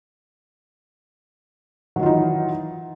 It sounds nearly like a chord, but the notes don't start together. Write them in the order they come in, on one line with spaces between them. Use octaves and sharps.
F#3 D#3 F4 D#4 E3